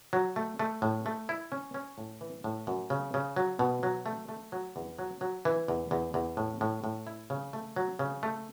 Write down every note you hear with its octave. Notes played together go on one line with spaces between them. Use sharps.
F#3
A3
A3
A2
A3
E4
C#4
C#4
A2
E3
A2
F#2
C#3
C#3
F#3
B2
F#3
A3
A3
F#3
E2
F#3
F#3
E3
E2
E2
E2
A2
A2
A2
E4
C#3
A3
F#3
C#3
A3